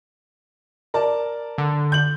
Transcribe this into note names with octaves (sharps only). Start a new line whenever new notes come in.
A#4 D5 A5
D3
G6 F#7